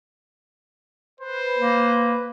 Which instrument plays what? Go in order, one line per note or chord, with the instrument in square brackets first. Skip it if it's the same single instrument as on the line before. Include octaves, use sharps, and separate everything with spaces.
[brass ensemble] B4 [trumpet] C5
[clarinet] A#3